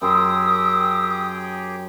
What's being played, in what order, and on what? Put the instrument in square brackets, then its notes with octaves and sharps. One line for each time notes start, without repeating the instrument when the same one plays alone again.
[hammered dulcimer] F#2 C6 [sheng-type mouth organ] G4 G#4 G5 [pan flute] D#6 [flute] E6